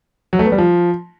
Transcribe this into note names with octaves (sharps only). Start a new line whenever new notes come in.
F#3
A3
B3
G3
F3